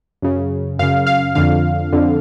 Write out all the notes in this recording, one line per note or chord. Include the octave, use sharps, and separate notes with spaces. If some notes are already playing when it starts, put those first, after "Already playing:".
F#2 C#3
F#2 C#3 F5
F5
F2 D3 F5
F2 D3